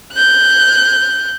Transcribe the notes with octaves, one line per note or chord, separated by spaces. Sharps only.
F#6 G6